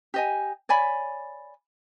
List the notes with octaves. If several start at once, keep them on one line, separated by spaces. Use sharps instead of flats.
G4 D#5 G#5
C#5 D5 G#5 B5